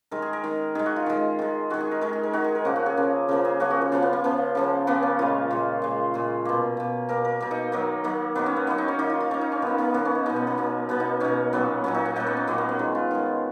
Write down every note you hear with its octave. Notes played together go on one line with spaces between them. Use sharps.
D#3 G#3 A#4
G#4
A#4
D#3 G#3
D#3 G#3 G#4
F#4
F4
D#3 G#3
D#3 G#3
D#3 G#3 F#4
G#4
A#4
D#3 G#3 A#4
G#4
A#4
D#3 G#3 F#4
G#4
A#4
C#3 F3 A#3 F#4
F#4
G#4
C#3 F3 A#3
C#3 F3 A#3 A#4
G#4
C#3 F3 A#3 F#4
F#4
F#4
C#3 F3 A#3 F4
B3
A#3
C#3 F3 A#3
C#3 F3 A#3
C#3 F3 A#3 B3
C#4
A#2 G#3 F4
A#2 G#3
A#2 G#3
A#2 G#3
B2 A#3
B2 A#3
B2 A#3 A#4
A#4
B2 A#3 A#4
D#4
D#3 F#3 A#3
D#3 F#3 A#3
D#3 F#3 A#3 B3
C#4
B3
D#3 F#3 A#3 B3
D#4
C#4
D#3 A#3 D#4
F4
F4
D#3 A#3 C#4
D#4
C#4
D#3 A#3 B3
A#3
D#3 A#3 B3
C#4
D#4
B2 A#3 D#4
B3
A#3
B2 A#3
B2 A#3 B3
D#4
B2 A#3 C#4
A#2 F#3 A#3 B3
A#2 F#3 A#3 C#4
D#4
F#4
A#2 F#3 A#3 D#4
B3
C#4
A#2 F#3 A#3 B3
A#3
B3
D#3 G#3
F4
D#3 G#3